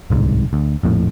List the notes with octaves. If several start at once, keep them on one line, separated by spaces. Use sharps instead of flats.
D1 C2 G#2
D2
A#1 F2 A2